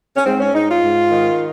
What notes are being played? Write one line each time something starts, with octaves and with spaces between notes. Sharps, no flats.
C#4
G#2 C4
C#4
G#2 D#4
F4
G#2
D#3